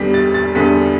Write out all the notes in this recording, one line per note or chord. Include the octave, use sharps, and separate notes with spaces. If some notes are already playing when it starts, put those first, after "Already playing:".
Already playing: E2 D3 G3 B3 B6
A6
A6
E2 D3 G3 B3 B6